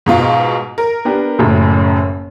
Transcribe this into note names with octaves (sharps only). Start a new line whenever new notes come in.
G#2 B2 F4
A#4
B3 D4 G4
F#1 F#2 A2